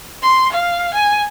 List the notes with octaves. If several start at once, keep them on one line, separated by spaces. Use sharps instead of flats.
C6
F5
G#5